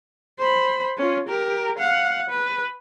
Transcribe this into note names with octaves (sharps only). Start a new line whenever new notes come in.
C5 B5
C#4 F4
G4 A#4
F5 F#5
B4